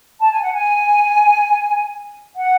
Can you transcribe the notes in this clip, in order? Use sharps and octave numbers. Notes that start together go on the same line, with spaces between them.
A5
G#5
F#5
G#5
F#5